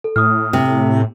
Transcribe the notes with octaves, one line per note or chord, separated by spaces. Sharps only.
A4
A2 D#6 F6
C3